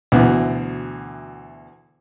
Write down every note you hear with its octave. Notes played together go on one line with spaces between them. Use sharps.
D2 B2 E3